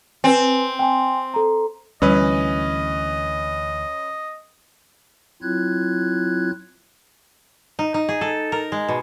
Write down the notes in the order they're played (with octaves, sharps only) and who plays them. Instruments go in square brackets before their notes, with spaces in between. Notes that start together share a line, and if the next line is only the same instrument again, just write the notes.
[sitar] C4 [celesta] B4 G#5
[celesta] G5 G#5 C6
A4 A#5
[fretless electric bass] D2 E3 [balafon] G3 [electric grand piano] C#4 B4 [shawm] D#5
[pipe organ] F#3 C4 E4 F4 F#6 G#6
[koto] D#4
D#4
G#4
A4
A#4
G#3
B2